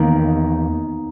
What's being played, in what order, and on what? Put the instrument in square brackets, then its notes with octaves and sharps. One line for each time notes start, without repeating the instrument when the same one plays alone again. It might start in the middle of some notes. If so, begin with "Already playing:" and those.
Already playing: [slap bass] E2 D#3 A#3 [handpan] B3 D#4